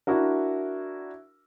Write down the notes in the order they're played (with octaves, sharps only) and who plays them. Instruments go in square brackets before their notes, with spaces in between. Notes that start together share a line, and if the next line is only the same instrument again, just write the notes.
[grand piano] D4 E4 F#4 A#4